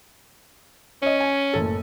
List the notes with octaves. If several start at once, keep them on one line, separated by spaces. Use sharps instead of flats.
C#4 C#5 D#5
G#5
F#1 A2 A4